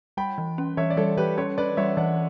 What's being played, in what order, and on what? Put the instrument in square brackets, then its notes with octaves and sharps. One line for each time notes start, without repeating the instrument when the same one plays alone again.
[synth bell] G3 [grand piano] G5 B5
[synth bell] E3
C#4
[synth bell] E3 [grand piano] C#5 E5
[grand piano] D5
[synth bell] G3 [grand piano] A4 C#5
[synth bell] E3 [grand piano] G4 B4
[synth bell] C#4 [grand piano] A4 C#5
[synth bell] E3 [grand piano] B4 D5
[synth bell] G3 [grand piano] C#5 E5
[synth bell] E3 [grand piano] D5 F#5